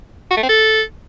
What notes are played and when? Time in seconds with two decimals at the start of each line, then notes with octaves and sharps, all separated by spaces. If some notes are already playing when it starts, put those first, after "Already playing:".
0.31 F#4
0.37 A3
0.43 C4
0.49 A4